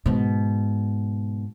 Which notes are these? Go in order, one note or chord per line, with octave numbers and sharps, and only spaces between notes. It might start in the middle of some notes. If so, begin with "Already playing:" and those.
G#2 B2